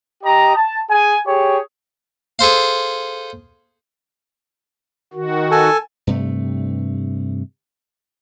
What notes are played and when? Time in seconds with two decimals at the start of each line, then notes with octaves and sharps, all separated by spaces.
0.24 G4 D#5 A#5
0.56 A5
0.91 G#4 G#5
1.27 G4 G#4 C#5
2.39 G#4 A4 C5 F5
5.14 D#3 F#4
5.52 A4 G#5
6.07 G2 C3 A3